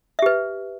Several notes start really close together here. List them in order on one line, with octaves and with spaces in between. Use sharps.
E5 G4 B4